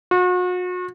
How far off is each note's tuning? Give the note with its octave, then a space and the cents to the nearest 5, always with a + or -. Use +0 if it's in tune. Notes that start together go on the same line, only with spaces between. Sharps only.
F#4 -40